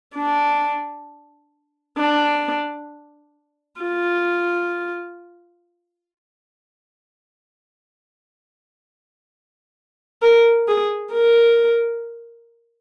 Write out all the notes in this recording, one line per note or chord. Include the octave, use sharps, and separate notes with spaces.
D4
D4
F4
A#4
G#4
A#4